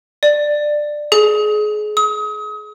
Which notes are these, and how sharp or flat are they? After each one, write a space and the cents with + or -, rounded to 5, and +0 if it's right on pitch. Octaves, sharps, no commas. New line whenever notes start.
D5 +15
G#4 +30
D#6 +35